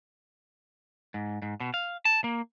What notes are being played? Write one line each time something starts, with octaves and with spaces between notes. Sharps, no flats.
G#2
G#2
B2
F5
A5
A#3